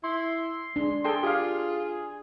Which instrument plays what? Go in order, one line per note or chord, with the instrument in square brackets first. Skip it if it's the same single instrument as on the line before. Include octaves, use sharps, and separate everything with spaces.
[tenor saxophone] E4 [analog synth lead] C6
[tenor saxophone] G#3 [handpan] D4
[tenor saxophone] G#4 [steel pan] A4 G5 C6
[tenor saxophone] F4 [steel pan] G4 F5 [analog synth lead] G#4